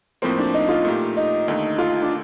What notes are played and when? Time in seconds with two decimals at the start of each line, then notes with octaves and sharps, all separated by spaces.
0.22 A2 F3 A#3 C4
0.38 D4
0.54 D#4
0.69 F4
0.85 A#2 A3 D#4 G4
1.17 D#4
1.48 D#2 D3 A3 D#4
1.78 F4
2.02 D4